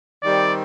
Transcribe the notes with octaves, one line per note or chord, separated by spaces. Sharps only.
D#3 G3 C4 D5